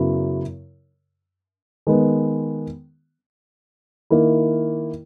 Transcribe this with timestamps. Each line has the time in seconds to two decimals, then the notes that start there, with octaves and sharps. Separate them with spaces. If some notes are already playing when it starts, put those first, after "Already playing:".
Already playing: F#2 C#3 F#3 B3 E4
1.87 D#3 G#3 B3
4.10 D#3 A#3 E4